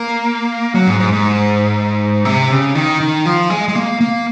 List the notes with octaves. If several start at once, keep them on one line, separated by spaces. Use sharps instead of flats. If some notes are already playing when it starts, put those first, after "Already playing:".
Already playing: A#3
F#3
G#2
G#2
G#2
C3
C#3
D#3
D#3
F3
G#3
G#3
A#3
A#3